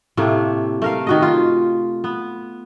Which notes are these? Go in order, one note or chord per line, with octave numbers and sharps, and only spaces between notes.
A2 C3 A3 A#3
A3 A#4 F5
D#3 F#4 D#5
F4
B3